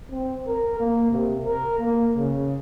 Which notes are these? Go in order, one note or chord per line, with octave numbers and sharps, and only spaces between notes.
C4
A#4
A#3
C3
A#4
A#3
C#3